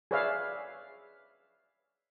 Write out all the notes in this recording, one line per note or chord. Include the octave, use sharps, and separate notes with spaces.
G#4 B4 C#5 D5 E5 F5